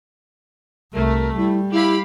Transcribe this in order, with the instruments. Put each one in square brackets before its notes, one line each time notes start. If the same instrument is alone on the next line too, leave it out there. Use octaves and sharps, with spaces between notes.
[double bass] C2 [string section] A3 [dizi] A#4
[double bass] G3 [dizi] E4
[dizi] E4 [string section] G4 F5 B5